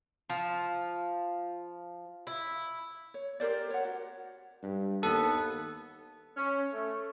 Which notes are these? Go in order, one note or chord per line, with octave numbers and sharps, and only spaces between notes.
F3
E4
C#5
G4 A#4 C5 D5
C#5 F#5
F#4
G2
D#2 B3 A4
C#4
A3